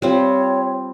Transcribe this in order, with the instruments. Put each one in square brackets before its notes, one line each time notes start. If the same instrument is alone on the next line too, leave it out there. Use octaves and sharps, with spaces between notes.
[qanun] G3 C4 F4 [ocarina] C#5